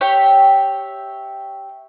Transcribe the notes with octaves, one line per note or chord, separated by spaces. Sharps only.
G4 C#5 E5